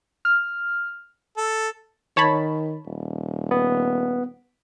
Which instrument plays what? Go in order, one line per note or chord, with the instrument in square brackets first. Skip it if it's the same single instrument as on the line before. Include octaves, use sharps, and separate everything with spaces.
[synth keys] F6
[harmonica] A4
[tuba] D#3 [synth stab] C#5 A5 B5
[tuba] D#1
[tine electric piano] B3